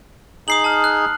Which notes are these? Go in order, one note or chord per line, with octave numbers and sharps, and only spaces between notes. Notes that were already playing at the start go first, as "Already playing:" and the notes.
D#4 G#4 D#6 C7 F#7
A5 F6
F#6